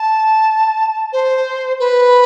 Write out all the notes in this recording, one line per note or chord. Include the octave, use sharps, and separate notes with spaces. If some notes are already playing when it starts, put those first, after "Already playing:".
Already playing: A5
C5
B4